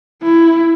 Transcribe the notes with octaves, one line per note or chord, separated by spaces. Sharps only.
E4